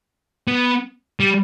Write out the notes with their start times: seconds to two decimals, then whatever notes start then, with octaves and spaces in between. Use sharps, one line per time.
0.48 B3
1.20 G3